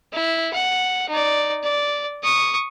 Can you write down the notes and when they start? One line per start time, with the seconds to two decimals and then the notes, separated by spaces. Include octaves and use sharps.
0.13 E4
0.53 F#5
1.09 D#4 D5
1.63 D5
2.23 C#6 D#6